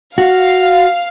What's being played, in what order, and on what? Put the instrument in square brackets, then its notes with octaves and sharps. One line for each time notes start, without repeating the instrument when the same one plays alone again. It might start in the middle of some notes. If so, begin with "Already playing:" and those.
[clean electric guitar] F#4 [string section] F5